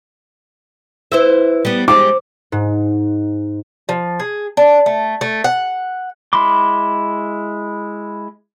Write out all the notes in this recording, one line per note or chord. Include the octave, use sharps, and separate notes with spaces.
E4 B4 C5 E5
G3 B3
G3 G#3 C5 D6
G#2
F3
G#4
D4
A3
A3
F#5
G#3 E4 B5 C6 D6